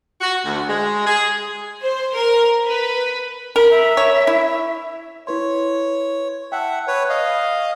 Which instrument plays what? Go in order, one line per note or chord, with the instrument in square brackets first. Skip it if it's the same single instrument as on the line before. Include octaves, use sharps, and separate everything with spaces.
[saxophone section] F#4
D2
G#3
G#4
[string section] C5
A#4
B4
[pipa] A#4 [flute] B5
[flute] E5
[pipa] C#5
E4
[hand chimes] E4 B4 C6 [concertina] C#5
[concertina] E5 F#5 [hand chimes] G5 A5
[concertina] B4 C#5
D#5 F5